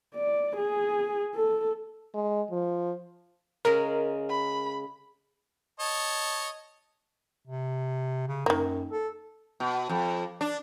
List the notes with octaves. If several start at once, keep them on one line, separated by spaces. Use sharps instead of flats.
D5
G#4
A4
G#3
F3
C#3 G#3 C#4 A#4
B5
C#5 D#5 A5
C3
C#3
F#2 D#3 A#3
A4
B2
F2
D4